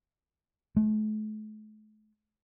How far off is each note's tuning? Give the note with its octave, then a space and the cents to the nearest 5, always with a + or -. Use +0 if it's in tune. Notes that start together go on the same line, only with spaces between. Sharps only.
A3 -40